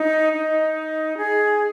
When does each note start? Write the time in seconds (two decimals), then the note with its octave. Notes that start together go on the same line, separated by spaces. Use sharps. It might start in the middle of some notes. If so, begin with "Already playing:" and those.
Already playing: D#4
0.33 D#4
1.17 G#4